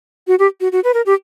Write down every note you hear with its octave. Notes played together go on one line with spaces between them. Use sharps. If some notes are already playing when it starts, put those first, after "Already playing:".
F#4
G4
F#4
F#4
B4
A#4
G4